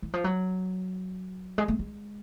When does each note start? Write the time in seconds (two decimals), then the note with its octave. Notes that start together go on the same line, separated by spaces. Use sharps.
0.02 E3
0.13 F3
0.24 F#3
1.58 G#3
1.68 A3
1.79 G#3